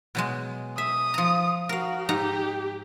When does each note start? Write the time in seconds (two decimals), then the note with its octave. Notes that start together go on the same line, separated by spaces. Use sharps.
0.15 B2 F#3 G#3
0.78 E5 D#6
1.14 F3 A#5
1.69 F#4 A#4 F5
2.09 G#2 D#4 G4 A#5